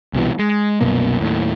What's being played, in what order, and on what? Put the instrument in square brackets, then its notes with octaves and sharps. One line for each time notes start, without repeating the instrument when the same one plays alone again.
[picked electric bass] C2 B2 E3
G#3
C2 F#2 B2 A#3
D#2 A2